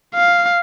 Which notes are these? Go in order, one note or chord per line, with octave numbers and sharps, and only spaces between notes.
F5